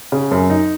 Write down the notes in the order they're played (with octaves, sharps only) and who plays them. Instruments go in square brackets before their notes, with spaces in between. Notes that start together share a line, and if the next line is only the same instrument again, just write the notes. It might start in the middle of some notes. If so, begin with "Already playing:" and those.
[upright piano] C#3
F#2
D#4